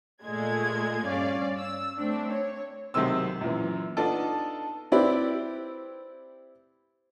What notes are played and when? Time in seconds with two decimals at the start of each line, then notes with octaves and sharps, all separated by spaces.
0.24 A#2 G#3 A3 G#6
1.05 G2 C#4 D5 F5
1.57 E6
1.97 A3 C4 D4
2.32 C#5
2.94 B1 C3 D#3 G#3 C4 E6
3.41 F#2 A#2 E3
3.97 B3 D4 D#4 F4 A4
4.92 C4 E4 G4 B4 D5